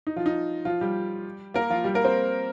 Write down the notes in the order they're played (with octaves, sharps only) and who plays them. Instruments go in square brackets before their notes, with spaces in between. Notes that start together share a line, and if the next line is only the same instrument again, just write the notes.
[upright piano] D#4
F3 F4
D#4
F3 F4
G3 G4
A#3 A#4
F3 F4
G3 G4
A#3 A#4
C4 C5